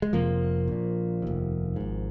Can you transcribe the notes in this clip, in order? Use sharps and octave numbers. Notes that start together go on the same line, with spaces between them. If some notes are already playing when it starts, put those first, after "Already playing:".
G#3
F1 F2 C3 F3 A#3
A#1 A#2
F1 D#2
G#1 G#2